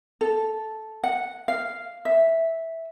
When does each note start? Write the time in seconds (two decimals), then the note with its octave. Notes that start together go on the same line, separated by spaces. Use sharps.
0.21 A4
1.04 F#5
1.48 F5
2.05 E5